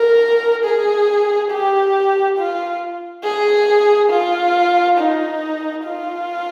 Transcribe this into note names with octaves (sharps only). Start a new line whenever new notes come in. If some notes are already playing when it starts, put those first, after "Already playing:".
Already playing: A#4
G#4
G4
F4
G#4
F4
D#4
F4